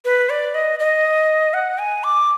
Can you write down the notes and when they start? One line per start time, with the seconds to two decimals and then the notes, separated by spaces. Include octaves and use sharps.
0.05 B4
0.30 D5
0.54 D#5
0.80 D#5
1.54 F#5
1.79 G#5
2.04 D6